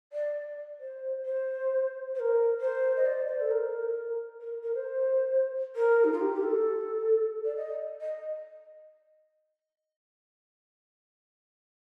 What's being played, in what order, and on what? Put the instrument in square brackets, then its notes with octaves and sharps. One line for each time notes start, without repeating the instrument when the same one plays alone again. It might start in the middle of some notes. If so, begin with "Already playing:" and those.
[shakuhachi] D5
C5
C5
C5
A#4
C5
D#5
D5
C5
A4
A#4
A#4
A#4
C5
A#4
D#4
F4
G4
G4
A4
D5
D#5
D#5